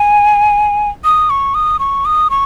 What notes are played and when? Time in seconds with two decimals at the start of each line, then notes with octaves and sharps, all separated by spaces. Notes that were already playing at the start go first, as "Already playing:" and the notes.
Already playing: G#5
1.04 D#6
1.30 C#6
1.54 D#6
1.79 C#6
2.05 D#6
2.30 C#6